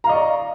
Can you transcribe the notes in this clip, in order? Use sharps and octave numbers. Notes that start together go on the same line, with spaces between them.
D5 D#5 F5 A#5 C#6